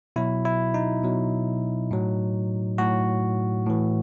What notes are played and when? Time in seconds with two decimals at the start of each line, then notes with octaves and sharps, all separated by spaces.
0.16 B2 F#3 E4
0.45 E4
0.74 D#4
1.04 B2 F#3
1.91 A2 F#3
2.78 A2 F#3 F#4
3.66 A2 E3